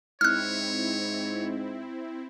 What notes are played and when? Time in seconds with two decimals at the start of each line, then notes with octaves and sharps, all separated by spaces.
0.21 G#2 C4 E4 C#5 F6 F#6